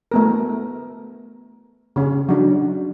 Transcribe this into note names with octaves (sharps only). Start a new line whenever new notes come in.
A3 B3 A#4
C#3 C#4 G#4
F#3 D4 D#4